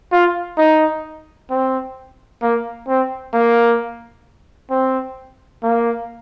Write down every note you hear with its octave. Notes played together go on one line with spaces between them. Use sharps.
F4
D#4
C4
A#3
C4
A#3
C4
A#3